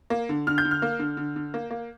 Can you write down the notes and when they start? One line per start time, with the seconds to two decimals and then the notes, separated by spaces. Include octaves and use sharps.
0.10 A#3
0.29 D3
0.47 D3 F6
0.58 G6
0.65 D3
0.71 F6
0.82 A#3
0.99 D3
1.17 D3
1.36 D3
1.54 A#3
1.70 A#3